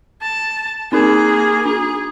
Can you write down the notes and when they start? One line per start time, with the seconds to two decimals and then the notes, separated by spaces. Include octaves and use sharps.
0.22 A5
0.92 A#3 C4 D#4 G#4 A#4
1.66 D4 G#4